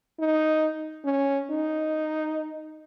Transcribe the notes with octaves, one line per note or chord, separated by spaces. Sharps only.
D#4
C#4
D#4